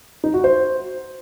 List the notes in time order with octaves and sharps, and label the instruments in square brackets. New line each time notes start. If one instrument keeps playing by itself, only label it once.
[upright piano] D#4
F#4
C5